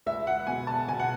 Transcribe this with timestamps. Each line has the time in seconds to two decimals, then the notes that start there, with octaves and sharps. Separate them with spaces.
0.06 C#2 E5
0.27 F#5
0.47 B2 G#5
0.67 A5
0.88 B2 G#5
0.99 F#5